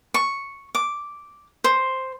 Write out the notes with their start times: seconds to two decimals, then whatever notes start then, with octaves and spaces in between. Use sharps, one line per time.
0.14 C#6
0.75 D6
1.64 C5